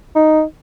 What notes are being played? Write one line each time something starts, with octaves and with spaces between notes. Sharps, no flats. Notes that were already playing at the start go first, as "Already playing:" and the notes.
D#4